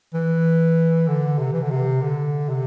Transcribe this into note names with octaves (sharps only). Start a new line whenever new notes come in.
E3
D3
C3
E3
D3
C3
D3
C3